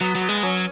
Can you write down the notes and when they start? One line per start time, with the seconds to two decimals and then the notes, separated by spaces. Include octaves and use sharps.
0.01 F#3 B3
0.15 F#3
0.21 B3
0.29 G#3
0.43 F#3 C#4